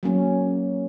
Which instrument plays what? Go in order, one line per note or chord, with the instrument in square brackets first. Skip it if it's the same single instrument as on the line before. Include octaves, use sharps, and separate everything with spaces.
[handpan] F#3 A#3 C#4